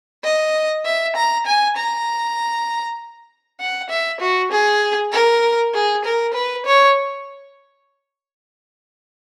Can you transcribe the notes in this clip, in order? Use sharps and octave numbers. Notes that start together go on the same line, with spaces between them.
D#5
E5
A#5
G#5
A#5
F#5
E5
F#4
G#4
A#4
G#4
A#4
B4
C#5